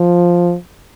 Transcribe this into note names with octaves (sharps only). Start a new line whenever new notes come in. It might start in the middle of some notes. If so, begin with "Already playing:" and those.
Already playing: F3